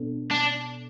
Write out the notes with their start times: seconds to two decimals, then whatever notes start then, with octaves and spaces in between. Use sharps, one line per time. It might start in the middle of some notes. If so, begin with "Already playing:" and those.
Already playing: B2 B3 D4 A4
0.31 D4